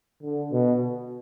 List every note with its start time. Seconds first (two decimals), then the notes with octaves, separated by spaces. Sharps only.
0.22 D3
0.52 B2